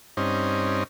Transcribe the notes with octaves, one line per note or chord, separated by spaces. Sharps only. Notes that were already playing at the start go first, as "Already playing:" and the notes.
G2 C4 C#4 D#4